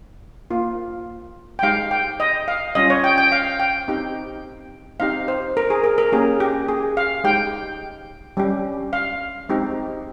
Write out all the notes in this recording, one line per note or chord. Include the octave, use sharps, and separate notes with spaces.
A#3 F4
G5
G#3 D#4 G4 F5
G5
D#5
F5
G3 C#4 F4 D#5
C#5
G5
G5
F5
G5
C4 D#4 G4
C4 D#4 G4 F5
C5
A#4
G#4
A#4
A#4
A#3 C#4 G4 G#4
G4
G#4
F5
G#3 D#4 G4 G5
G3 C#4 G4
F5
G#3 C4 D#4 G4